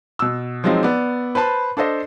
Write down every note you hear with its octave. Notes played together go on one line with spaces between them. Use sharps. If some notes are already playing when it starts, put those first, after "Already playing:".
B2 E6
F3 F#3 G#3 C4 D#4
B3 D5
B4 C5 A5 B5
D4 A4 C5 D#5